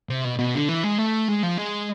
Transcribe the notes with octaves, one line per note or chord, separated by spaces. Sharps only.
C3
B2
B2
D3
E3
G#3
A3
G#3
F3
G#3